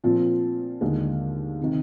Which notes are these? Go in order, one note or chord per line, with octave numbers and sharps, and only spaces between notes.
A#2 F3 C4 F4
D#2 D3 G#3
C3 D#3